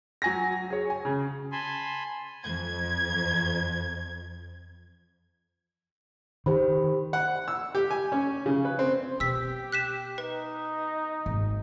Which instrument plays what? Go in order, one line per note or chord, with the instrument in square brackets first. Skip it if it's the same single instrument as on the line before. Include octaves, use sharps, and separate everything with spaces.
[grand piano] F#3 G#5 A#6
G#4 C#5
G#5
C#3
[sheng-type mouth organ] G#5 A5 B5 C6
[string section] F2 G#6
[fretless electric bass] D#3 [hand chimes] G4 C5 B5
[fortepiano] F#5
E6
G4
G#5
C#4
C#3
B4
C4
[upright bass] B2 [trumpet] G4 [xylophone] E6 B6
[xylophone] F#6 B6 E7
[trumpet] D#4 [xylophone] B4
[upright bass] G#1